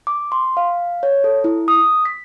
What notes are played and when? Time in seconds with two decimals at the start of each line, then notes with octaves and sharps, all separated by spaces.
0.07 D6
0.32 C6
0.57 F5
1.03 C#5
1.24 A4
1.44 E4
1.68 D#6
2.05 B6